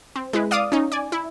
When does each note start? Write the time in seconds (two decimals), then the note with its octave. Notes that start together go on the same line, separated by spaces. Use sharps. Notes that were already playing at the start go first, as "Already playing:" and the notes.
0.16 C4
0.33 G#3 E4 B4
0.51 D5 F5 D6 D#6
0.72 C#4 D#4
0.92 D5 G#5
1.12 E4